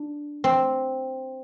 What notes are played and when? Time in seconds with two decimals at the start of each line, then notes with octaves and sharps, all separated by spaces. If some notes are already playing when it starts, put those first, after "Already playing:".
Already playing: D4
0.44 C4